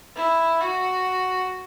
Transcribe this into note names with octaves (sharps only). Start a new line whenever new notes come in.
E4
F#4